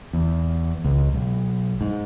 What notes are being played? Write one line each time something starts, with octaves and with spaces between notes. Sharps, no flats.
E2
C#2
B1
G#2